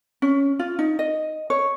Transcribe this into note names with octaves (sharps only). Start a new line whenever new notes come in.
C#4
F4
D#4
D#5
C#5